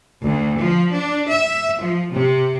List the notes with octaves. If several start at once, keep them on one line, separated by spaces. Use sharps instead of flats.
D2
F3
D4
E5
F3
C3